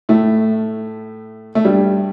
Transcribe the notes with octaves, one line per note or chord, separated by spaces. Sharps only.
A2 A3
A3
G2 G3